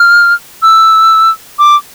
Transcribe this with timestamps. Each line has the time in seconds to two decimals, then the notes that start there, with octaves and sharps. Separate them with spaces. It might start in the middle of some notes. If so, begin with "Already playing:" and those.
Already playing: F6
0.63 E6
1.59 D6